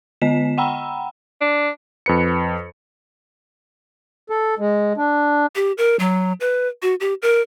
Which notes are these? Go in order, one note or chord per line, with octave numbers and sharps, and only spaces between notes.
D3 B3 D#5 B6 E7
F#5 G5 A#5 B5 E6
D4
F2 B4 C#7
A4
G#3
D4
G4
A#4
F#3
B4
F#4
G4
A#4